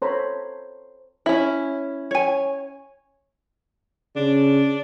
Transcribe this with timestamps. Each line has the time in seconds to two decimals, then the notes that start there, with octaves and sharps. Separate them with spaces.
0.02 A4 C5 C#5 A#5 B5
1.26 C#4 E4
2.11 C#5 G#5
4.16 C#3 D4